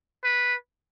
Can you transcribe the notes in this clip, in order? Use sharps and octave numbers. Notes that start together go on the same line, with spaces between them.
B4